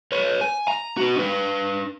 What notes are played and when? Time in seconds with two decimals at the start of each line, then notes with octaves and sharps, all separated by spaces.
0.12 B4 C#5
0.41 G#5
0.68 A#5
0.97 B3 F#4
1.16 D4 B4